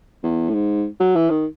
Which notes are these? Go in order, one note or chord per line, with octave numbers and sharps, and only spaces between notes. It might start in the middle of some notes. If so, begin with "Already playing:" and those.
E2
A2
G#2
F#3
E3
D#3